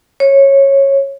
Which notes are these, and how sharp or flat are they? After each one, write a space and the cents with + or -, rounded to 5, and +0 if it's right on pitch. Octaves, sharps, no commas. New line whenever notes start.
C#5 -15